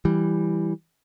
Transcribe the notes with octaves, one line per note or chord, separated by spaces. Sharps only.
E3 G3